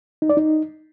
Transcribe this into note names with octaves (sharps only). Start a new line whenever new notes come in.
D#4
D5
D#4